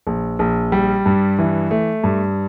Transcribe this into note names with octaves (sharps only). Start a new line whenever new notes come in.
A#1
A#1
G3
G2
E3
A3
G2